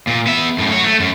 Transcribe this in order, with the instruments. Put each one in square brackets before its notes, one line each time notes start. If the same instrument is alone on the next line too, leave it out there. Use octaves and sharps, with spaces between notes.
[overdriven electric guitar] A#2
B3 E5
F#2 A2
F#4 C#5
A3
F#2